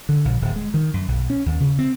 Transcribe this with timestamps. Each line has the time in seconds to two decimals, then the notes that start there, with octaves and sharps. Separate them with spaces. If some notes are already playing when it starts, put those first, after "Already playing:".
0.09 D3
0.25 A#1
0.42 D1
0.56 G#3
0.74 D#3
0.94 F#2
1.08 B1
1.30 C#4
1.46 D#2
1.60 C#3
1.79 C4